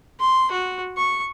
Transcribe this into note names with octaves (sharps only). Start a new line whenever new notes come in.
C6
F#4
C#6